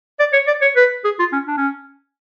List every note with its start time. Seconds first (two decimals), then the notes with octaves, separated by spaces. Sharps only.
0.20 D5
0.33 C#5
0.47 D5
0.62 C#5
0.76 B4
1.05 G#4
1.19 F4
1.33 C#4
1.47 D4
1.57 C#4